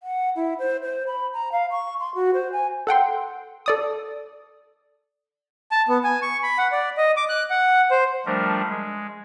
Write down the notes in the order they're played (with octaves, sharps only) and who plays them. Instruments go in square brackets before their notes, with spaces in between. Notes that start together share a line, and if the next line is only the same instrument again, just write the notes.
[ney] F#5
E4
C5
C5
B5
A#5
F5
C#6
C6
F#4
C5
G#5
[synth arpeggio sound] A4 F#5 G5 C6
A4 D5 D#6
[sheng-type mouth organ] A5
B3
G#5
C#6
B5
F#5
D5
D#5
D6
F#6
F#5
C5
[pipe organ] F3 G3 A3 D4 A#4
G#3